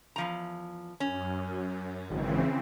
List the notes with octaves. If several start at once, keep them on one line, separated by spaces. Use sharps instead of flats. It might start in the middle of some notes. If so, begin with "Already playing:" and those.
E2 F3 A#5
F#2 C#4
G#1 C#3 E3 C4